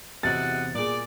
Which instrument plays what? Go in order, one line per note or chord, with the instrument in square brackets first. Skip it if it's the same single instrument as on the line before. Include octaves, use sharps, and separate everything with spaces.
[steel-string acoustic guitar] E2 C3 [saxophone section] G#3 E4 F#4 [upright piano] A6
[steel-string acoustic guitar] A#2 G#4 [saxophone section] D5